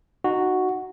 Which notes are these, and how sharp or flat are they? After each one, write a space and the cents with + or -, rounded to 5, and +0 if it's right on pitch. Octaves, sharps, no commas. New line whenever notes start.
D#4 -15 F#4 +0